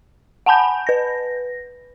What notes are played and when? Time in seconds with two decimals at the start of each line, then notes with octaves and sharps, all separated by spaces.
0.46 F#5 G#5 A5 B5 G6
0.87 B4 A#6